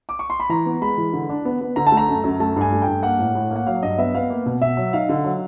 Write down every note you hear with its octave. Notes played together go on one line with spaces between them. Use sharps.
D6
C#6
C6
B5
E3 A#5
B3
G#3 B5
E3
D3
D4
B3
B3
D3 A#5
A5
A3
A#5
F#2
F#2
A3 A5
G2 G#5
A3
G5
G2
A#3 F#5
A2
A2
A#3
F#5
F#3 F5
G2 D#5
B3 E5
B3 F5
A#3
B2
B2 E5
F#3
D#4 F5
D3
F#3